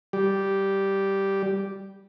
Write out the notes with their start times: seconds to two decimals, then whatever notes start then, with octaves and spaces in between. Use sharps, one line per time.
0.13 G3 G4